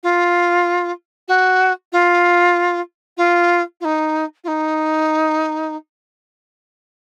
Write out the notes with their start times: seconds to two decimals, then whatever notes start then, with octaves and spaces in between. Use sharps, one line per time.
0.03 F4
1.28 F#4
1.92 F4
3.17 F4
3.81 F4
3.85 D#4
4.44 F4
4.48 D#4